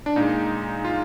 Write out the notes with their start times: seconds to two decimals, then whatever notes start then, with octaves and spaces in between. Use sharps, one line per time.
0.06 D4
0.16 A#2 G#3 D#4
0.85 F4